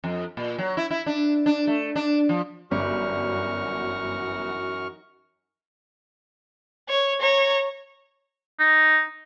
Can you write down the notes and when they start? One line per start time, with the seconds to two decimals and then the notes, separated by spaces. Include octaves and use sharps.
0.04 F2
0.37 A#2
0.58 F#3
0.77 E4
0.90 E4
1.06 D4
1.46 D4
1.67 A3
1.96 D4
2.29 F3
2.71 G1 F#2 E3 D#4 F#4 D5 C#6 F6
6.89 C#5
7.21 C#5 A#5
8.59 D#4